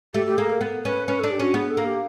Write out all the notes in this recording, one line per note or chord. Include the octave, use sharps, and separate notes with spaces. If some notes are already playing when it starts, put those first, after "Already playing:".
A3 G4
G4
A#3 G#4
A#4
B3
C#4 B4
C#4 B4
D4 A4
G4
C#4 F#4
B3 G#4
A4
A#3
G4